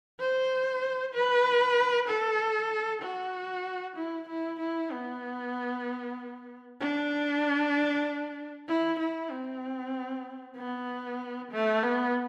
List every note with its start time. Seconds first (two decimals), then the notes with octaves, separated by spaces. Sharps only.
0.20 C5
1.14 B4
2.08 A4
3.02 F#4
3.97 E4
4.28 E4
4.60 E4
4.91 B3
6.80 D4
8.68 E4
8.99 E4
9.31 C4
10.57 B3
11.52 A3
11.83 B3